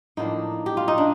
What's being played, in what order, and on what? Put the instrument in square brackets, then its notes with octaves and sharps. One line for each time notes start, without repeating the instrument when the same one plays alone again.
[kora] A2 F3 A#3 D4 D#4
G4
F4
D#4
D4